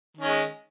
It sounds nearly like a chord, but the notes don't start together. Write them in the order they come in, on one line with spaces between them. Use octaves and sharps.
D#3 C#4 G#3